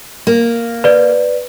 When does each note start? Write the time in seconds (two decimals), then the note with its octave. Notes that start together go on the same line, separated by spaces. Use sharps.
0.27 A#3
0.84 B4 D5